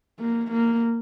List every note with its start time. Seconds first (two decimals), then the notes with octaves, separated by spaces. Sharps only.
0.20 A#3
0.51 A#3